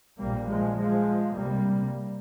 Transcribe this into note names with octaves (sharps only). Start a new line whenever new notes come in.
A#1 A#2 G3 A#3
F3 G#3
F3 G#3
C2 C3 G3 A#3